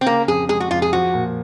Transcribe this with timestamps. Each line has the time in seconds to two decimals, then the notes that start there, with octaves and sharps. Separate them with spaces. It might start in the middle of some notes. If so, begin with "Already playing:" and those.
0.01 C4
0.06 C#3 A#3
0.28 F2 G#4
0.49 G#3 G#4
0.60 F#4
0.71 F2 F4
0.82 G#4
0.93 F3 F#4
1.14 A#2